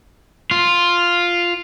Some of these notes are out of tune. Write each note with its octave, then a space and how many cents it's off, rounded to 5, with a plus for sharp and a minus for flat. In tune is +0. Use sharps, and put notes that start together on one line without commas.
F4 +0